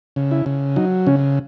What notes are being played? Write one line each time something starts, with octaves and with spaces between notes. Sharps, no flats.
C#3
E4
C#3
F#3 D#4
C#3 C#4